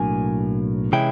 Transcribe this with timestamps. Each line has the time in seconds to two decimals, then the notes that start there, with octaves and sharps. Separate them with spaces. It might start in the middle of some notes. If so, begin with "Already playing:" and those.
Already playing: B1 A2 F#3 A#3 D4 G#5
0.92 C3 E3 G#3 C#4 E4 G5